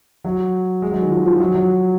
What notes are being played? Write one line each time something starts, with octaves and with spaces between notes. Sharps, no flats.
F#3
G#3
F#3
D#3
F3
F3
F#3
F#3